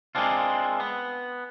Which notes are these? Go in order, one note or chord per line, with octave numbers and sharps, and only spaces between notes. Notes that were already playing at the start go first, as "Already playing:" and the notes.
G#3 A#3 C4 D4 F4
B3